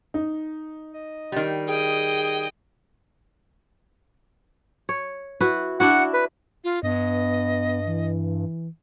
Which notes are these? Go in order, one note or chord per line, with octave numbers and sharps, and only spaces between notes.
D#4
D#5
D#3 G3
G#4 D#5 G5
C#5
E4 F#4 B4
D4 E4 F#4 F#5
B4
F4
G2 B3 D#5
E3